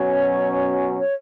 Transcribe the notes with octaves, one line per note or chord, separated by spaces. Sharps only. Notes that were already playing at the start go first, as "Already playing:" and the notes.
Already playing: B2 F#3 C#4 C#5
C#5